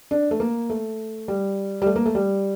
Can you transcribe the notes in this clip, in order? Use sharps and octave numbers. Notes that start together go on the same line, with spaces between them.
D4
A3
A#3
A3
G3
G3
A3
A#3
A3
G3